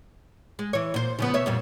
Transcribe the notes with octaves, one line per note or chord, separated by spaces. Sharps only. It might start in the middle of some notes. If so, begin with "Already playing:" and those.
G#3
E3 C#5
A#2 C5
C#3 F3 B3
B2 C#5 E5
F2 A#2 G3